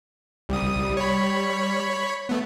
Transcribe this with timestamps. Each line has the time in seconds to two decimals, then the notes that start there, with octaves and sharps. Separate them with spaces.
0.49 C2 G3 D#6
0.97 C#5 B5
2.29 A3 B3